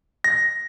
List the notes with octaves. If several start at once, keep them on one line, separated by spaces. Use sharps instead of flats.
A#6